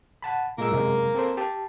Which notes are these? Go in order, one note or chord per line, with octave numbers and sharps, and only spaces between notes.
F#5 A5 B5
A#2 G#3 A#3 E6
F#2 C3 G#3
C4 A4 C5
G4 A5